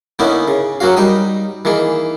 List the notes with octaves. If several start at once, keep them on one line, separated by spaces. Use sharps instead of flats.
D3 A#3 B3 C#4 D#4 E4
C#3
F#3 A#3 C#4 F#4 F5
G3 D#4 G5 D#6
D#3 E3 A#3 G#4